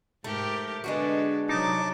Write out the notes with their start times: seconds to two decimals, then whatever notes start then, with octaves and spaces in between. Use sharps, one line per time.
0.24 G#2 A3 G4 A#4
0.84 D3 G#3 B3 D4 F#4 B4
1.49 C3 F#3 D#4 A5 D6